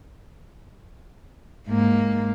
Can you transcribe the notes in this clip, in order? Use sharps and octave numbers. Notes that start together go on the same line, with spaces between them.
G#2 A#3